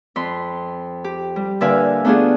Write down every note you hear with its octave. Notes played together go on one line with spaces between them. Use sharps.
F2 B5 C6
G4
G3
A#2 D3 B4 E5 F5 G#5
A3 B3 D4 F4 F#4 G#4